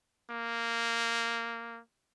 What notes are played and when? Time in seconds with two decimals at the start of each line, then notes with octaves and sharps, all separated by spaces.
0.31 A#3